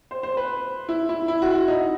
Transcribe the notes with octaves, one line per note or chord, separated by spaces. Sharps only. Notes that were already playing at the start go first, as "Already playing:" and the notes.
C5
C5
B4
E4
E4
E4
F#4
E4
D#4